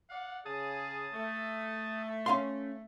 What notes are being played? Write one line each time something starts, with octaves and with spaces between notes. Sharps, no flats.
D5 F5 F#5
C#3 G#4 A5 D#6
A3
C#4 F5 C6